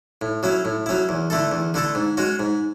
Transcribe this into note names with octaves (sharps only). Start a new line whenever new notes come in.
A2
F#3 C#4 E4
A2
F#3 C#4 E4
E2
D3 A3 E4 A4
E2
D3 A3 E4 A4
G#2
G#3 C#4 F#4
G#2